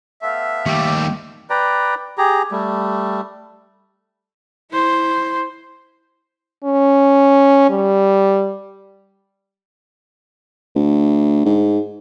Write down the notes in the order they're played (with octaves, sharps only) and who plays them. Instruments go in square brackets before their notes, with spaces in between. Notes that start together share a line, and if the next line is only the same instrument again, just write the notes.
[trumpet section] A3 B3 F5 [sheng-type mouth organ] E5
[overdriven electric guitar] D#2 [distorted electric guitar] G3 A3 [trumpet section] G4
[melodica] B4 D5 G5 A#5
G4 G#4 A#5
G3 A3
[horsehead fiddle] E4 C5
[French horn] C#4
G3
[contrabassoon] D2
G#2